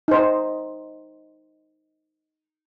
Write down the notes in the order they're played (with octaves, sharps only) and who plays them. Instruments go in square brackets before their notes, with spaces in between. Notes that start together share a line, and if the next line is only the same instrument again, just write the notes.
[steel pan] D#4 C5